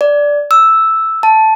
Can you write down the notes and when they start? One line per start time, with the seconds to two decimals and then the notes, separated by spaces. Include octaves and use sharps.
0.01 D5
0.51 E6
1.23 A5